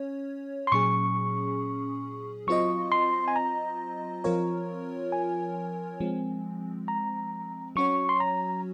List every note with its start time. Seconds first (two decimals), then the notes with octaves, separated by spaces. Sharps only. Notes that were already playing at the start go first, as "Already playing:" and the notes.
Already playing: C#4 C#5
0.67 C6
0.72 A#2 F#3 C#4 G#4 C#6
2.47 F#3 C4 F4 C5 D#5 C#6
2.92 C6
3.28 G#5
3.36 A#5
4.24 F3 C4 F4 A#4 C#5
5.12 G#5
6.00 F3 G#3 C4
6.88 A#5
7.76 F#3 C#4 F#4 C#5 C#6
8.09 C6
8.20 A#5